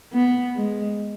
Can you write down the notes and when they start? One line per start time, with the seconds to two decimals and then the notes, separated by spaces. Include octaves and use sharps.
0.13 B3
0.55 G#3